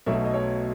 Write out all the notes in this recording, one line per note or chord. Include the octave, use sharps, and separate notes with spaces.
B1 B2 F#3 A3 E5
D#5
C#5